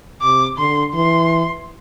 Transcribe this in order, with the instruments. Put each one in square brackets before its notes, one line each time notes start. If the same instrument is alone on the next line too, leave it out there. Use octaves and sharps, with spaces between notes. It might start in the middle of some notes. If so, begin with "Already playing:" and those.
[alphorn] C3 [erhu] D6
[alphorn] D3 [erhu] C6
[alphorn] E3 [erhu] C6